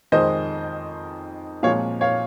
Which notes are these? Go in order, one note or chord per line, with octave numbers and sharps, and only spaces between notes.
F2 D#3 G#3 C5 D#5
A#2 F3 G#3 C4 C#5 F5
C#5 F5